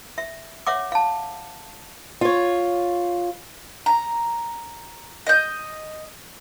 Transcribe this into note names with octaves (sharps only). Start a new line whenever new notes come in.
E5
C#5 E5 F#5 D6
F5 A5
F4 C#5
A#5
D#5 G6